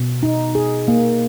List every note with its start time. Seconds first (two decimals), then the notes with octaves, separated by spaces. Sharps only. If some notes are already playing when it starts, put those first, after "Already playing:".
Already playing: B2
0.23 D#4
0.55 G#4
0.88 A#3